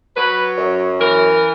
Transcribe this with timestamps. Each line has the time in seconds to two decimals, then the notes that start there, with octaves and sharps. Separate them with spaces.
0.16 F#3 B4
0.58 F#2
0.99 E3 A#4